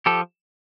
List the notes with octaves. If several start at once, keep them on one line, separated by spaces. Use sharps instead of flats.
F3 G4 A4